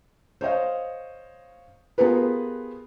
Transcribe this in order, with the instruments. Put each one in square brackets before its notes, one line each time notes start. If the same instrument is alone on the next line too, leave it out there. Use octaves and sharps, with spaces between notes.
[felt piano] C5 C#5 D#5 F5
B3 F4 G4 G#4 A#4 B4